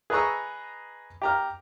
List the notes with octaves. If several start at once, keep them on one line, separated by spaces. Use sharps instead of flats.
G#4 B4 D#5 A#5 C#6 E6
G4 A#5 F6